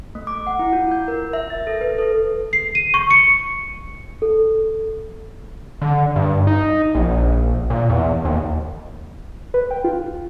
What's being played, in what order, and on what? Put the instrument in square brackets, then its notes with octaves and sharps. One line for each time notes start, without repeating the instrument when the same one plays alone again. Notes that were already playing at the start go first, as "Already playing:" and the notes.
[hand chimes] A3
D6
F#5
E4
F4
G6
A#4
E5
A6
A4
B4
A4
[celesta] C7
D#7
C#6
C#7
A4
[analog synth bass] D3
G2
D#4
A#1
A#2
E2
D#2
[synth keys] B4
G5
F4